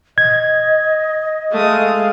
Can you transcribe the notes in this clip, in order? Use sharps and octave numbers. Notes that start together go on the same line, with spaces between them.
D#5 G#6
G#3 A3 F5 D#6